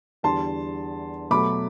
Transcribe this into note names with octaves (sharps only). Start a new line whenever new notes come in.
E2 D3 G3 A5 C6
B2 F#3 A3 B5 D6